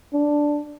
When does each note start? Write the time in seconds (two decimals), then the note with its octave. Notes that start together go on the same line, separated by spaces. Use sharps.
0.13 D4